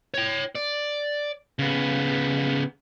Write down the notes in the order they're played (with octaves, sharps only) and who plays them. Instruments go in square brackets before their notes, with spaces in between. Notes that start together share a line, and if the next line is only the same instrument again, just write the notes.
[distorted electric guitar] C#5 G5
D5
C#3 B3